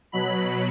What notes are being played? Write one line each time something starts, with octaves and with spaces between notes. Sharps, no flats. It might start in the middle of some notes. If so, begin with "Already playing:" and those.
B2 F#3 B5